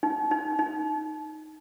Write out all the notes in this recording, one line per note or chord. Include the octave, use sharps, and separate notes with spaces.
D#4
D#4
D#4